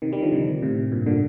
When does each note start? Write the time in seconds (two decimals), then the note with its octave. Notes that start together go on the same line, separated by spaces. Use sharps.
0.02 C3 D#3
0.12 D#3 G3
0.22 D3 F3
0.32 C3 D#3
0.62 A2 C3
0.92 G2 A#2
1.06 A#2 D3